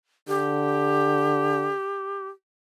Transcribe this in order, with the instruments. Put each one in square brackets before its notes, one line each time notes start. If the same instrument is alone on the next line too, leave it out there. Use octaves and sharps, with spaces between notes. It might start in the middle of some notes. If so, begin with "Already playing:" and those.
[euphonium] D3 [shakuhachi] G4